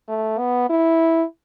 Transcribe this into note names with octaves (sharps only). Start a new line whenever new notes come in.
A3
B3
E4